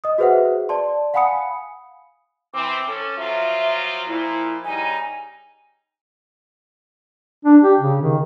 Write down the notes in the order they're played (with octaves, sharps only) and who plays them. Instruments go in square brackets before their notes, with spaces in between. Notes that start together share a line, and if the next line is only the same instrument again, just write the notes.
[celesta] D#5 D#6
F#4 G#4 B4 C5 E5 F#5
D5 A5 C6
F5 F#5 G#5 B5 D#6 C#7
[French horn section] E3 C4 [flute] D6
[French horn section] C#4 A4
[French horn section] F3 F#3 F4 [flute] E5
[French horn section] A#2 F3 [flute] E4
[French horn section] C#3 G3 D#4 [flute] G#5
[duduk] D4
G4
C#3
D#3